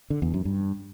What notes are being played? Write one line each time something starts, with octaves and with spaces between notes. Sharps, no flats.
D3
E2
F#2
G2